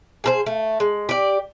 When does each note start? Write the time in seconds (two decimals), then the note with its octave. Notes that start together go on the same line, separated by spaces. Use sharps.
0.24 G#4 A4 C5
0.46 A3
0.80 G#3
1.09 G4 D5